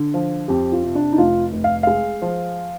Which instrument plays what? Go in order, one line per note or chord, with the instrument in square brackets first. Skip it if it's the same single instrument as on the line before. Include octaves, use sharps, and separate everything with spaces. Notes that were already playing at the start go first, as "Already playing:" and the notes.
Already playing: [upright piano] D3
F3
[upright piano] F2 [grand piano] G4
[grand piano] F4
[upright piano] C3
[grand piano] D4
D#4
[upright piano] F1 [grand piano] F4
[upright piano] F1
[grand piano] F5
[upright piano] G#3 [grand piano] F5
[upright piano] F3